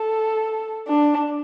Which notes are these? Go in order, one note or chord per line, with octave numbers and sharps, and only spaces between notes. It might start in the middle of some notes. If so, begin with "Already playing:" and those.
Already playing: A4
D4